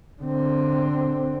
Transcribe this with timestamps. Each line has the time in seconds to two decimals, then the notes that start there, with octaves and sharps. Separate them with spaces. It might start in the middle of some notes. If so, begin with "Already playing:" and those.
0.23 D3 C4